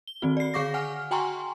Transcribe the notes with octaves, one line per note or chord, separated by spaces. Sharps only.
G7
D#3 C4 F#4
D5 C7
D3 G#4 F5 C#6 D6 A#6
F#5 G#5 F6
F#4 G5 G#5 A#5 C6 C#6